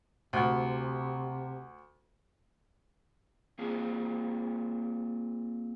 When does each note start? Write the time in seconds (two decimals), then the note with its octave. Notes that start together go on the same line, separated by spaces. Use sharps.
0.33 D2 C3
3.59 A#3 C4 F4 G#4